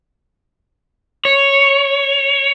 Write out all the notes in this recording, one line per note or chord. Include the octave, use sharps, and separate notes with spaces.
C#5